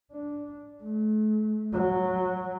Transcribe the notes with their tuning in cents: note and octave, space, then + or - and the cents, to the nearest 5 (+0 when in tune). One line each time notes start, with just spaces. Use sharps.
D4 -10
A3 -40
F#3 -10